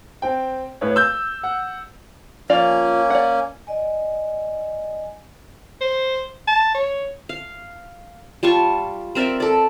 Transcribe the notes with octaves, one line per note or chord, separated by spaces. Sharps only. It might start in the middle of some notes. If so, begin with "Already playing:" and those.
C4 G5
A2 B4 C#5
E6 G6
F#5
F3 A#3 C#4 F4 D5
D5 F#5
D5 D#5 G#5
C5
A5
C#5
F5
G3 F4 A5 C#6
C4 A#4 D5 E5
A4 D5